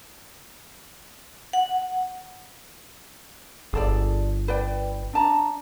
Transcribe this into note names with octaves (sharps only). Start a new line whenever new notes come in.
F#5
G1 G#4 A4 D5
B4 D5 G5
D4 A5 A#5